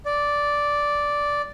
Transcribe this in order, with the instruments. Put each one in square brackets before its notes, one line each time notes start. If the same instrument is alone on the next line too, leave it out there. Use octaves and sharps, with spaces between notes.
[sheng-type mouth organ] D5